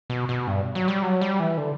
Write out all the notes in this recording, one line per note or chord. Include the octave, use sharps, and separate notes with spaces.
B2
B2
G2
F#3
G3
F#3
G3
E3
D3